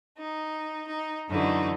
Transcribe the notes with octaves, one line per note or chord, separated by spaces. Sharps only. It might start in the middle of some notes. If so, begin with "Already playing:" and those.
D#4
D#4
F#2 D3 E3 A3 D#4